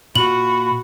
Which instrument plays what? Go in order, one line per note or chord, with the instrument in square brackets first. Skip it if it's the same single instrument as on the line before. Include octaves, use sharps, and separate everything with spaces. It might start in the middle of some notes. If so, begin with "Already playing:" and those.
[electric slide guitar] A#2 F4 [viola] F#4 [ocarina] B5 [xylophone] F#7